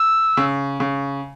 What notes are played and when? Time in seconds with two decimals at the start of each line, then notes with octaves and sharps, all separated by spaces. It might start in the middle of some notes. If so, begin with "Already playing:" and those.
Already playing: E6
0.37 C#3
0.80 C#3